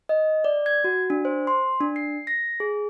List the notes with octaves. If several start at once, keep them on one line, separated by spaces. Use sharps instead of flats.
D#5
D5
G#6
F#4
D4
C5
C6
D4
C7
A#6
G#4